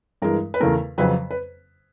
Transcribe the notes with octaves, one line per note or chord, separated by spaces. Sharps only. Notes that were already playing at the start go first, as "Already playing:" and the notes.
G2 E3 G#3 A#4
B4
E2 C#3 E3 A3 A#4
F2 C#3 F#3 B4
B4